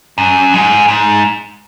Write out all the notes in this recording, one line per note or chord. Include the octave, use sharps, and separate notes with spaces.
F#2
G#2
G#2